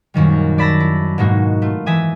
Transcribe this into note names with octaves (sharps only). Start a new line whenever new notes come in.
A#1 F#2 D#3 G3
D5 A5 B5 E6 A6 A#6
E4
G#2 B2 G#3 A#3 D#4 F#4
A3 F4
E3 E5 G#5 D#6